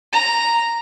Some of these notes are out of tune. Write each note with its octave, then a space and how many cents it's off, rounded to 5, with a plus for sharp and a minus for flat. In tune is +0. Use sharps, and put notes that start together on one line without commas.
A#5 -5